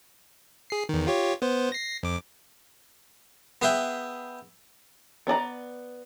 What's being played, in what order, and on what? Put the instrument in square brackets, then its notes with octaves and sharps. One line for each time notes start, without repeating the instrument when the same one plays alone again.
[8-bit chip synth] G#4 C7
E2 D#3
F4 G4 C#5
B3 C5
A#6 C7
F2 D6
[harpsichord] B3 G#4 B4 E5 G5
[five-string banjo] B3 D4 D5 A#5